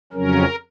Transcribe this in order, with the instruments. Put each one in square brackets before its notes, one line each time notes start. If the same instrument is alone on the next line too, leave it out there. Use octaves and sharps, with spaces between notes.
[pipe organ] F2 C#3 F#3 C#4 A#4